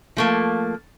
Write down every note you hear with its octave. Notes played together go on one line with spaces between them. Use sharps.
F3 A3 A#3